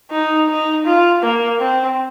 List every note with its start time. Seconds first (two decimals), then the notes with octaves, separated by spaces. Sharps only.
0.10 D#4
0.48 D#4
0.85 F4
1.22 A#3
1.59 C4